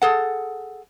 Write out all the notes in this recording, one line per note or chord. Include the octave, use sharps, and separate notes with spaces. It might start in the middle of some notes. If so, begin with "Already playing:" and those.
G#4 A4 F#5